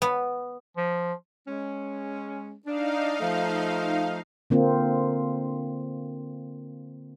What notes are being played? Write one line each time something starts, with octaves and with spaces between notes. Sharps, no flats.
B3
F3
G#3 C#4
D4 D#4 F5
F3 A3
D3 A#3 C4 F4